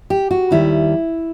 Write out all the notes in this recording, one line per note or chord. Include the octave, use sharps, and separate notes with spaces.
G4
F#4
D#2 D#3 G3 E4